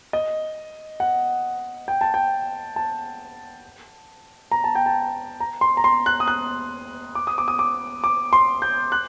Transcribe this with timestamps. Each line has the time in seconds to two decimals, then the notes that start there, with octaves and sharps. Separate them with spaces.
0.13 D#5
1.00 F#5
1.88 G5
2.01 A5
2.14 G5
2.76 A5
4.52 A#5
4.64 A5
4.75 G5
4.86 A5
5.40 A#5
5.61 C6
5.77 A#5
5.84 C6
6.06 F#6
6.20 D#6
6.28 F#6
7.15 D6
7.27 D#6
7.38 D6
7.48 D#6
7.59 D6
8.04 D6
8.33 C6
8.62 G6
8.92 F#6